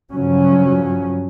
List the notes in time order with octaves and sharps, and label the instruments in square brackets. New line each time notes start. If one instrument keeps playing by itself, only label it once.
[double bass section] G2 C#3 F3 F#3 C#4